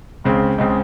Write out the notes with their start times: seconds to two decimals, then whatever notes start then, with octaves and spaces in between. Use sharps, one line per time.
0.24 C#2 C#3 G#3 C4
0.58 C#2 C#3 G#3 C4